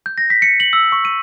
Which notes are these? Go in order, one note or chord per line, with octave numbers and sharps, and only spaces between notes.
G6
A#6
B6
C#7
F#7
E6
C#6
D#7